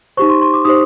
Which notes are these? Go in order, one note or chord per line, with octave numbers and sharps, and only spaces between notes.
D#4 G4 C5 C#6
C6
C6
D6
D#4 G4 C5 D#6